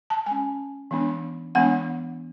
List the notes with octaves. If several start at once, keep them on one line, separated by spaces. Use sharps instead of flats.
A5
G#3 C#4 G#5
E3 G#3 B3 D4
E3 G#3 B3 D4 F#5